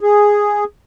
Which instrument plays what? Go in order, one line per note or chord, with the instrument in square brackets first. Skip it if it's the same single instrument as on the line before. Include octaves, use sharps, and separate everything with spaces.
[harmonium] G#4